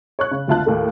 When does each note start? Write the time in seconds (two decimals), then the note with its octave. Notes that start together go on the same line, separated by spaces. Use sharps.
0.19 C#5 C#6 F#6
0.31 C#3
0.48 G#1 D2 F4 E5 A5 F#6
0.66 D#2 A2 A3